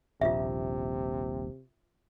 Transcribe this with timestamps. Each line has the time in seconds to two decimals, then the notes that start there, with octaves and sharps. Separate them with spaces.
0.21 D#1 A#1 C3 F4 E5